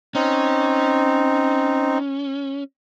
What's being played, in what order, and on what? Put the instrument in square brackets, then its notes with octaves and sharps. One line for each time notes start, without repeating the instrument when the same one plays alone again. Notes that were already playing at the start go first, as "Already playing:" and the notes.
[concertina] C4 D#4 [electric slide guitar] C#4